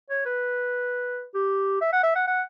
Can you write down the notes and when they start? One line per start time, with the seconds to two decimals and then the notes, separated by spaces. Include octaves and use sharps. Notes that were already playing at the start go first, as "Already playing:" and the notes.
0.10 C#5
0.25 B4
1.34 G4
1.81 E5
1.93 F#5
2.03 E5
2.15 F#5
2.27 F#5